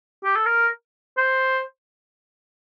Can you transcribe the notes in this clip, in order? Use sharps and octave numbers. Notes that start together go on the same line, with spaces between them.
G4
A4
A#4
C5